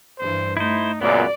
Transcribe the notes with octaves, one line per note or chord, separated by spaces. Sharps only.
G2 E3 C5
A3 D#4 E4 C5
C#2 F#2 A#2 A#3 B3 D5